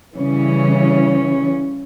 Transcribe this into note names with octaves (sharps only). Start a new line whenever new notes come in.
C#3 E3 G3 C#4